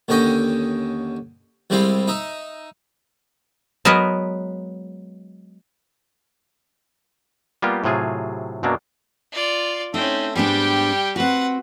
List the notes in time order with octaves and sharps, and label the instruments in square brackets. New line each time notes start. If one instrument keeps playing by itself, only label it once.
[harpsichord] D#2 D3 C#4 D#5 G5
C2 G3 G#3 C4 E4 F5
D#4 E5 D#6
[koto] F#3 G#3 B3 A#4 B4
[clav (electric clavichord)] G3 A#3 B3 F4 G4
A2 C3 F#3 F4 G#4
F#2 B2 F#3 A#3 D4
[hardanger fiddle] F4 D5
[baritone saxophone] A3 [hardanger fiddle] C4 C#4 [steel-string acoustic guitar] D#4
[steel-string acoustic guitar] G#2 B3 D4 [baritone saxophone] G3 [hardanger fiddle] G4 G5
[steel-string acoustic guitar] C4 F#4 [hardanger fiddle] B4 F#5